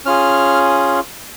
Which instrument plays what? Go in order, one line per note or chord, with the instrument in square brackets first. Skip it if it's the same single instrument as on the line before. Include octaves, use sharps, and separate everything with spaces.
[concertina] C#4 F4 G#4 F6